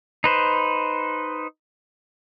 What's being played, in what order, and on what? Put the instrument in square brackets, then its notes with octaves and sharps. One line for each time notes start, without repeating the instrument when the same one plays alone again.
[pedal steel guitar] D#4 B4 C5